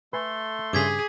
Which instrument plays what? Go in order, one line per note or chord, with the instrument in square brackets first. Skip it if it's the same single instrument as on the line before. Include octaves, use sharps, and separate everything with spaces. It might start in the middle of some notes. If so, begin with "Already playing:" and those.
[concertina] A3 A4 C6 [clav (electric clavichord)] B4 G#5
[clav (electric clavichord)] G2 C#3 [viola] G#4 [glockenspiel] D6 G#6 B6